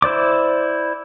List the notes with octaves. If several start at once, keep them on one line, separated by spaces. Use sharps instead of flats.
E4 C5 D5 D6